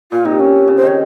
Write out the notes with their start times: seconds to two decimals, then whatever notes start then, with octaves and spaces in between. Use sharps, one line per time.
0.12 A#2 F4
0.25 C3 D#4
0.40 C#4
0.68 C#3
0.77 C5
0.82 D#3 C#5